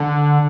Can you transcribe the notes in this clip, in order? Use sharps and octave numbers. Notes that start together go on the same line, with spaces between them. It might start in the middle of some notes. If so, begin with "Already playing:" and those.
Already playing: D3